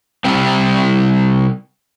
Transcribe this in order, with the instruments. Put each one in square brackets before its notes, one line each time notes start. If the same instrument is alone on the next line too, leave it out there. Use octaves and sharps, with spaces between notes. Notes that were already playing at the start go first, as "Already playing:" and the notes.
[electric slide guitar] C3 G3 C4